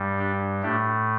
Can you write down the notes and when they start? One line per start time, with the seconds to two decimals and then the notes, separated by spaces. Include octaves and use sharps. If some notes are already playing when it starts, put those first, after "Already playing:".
Already playing: G2 G3
0.19 D4 G4
0.62 A2 A3 D4 G4